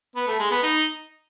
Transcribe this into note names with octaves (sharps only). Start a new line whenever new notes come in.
B3
A3
G#3
B3
D#4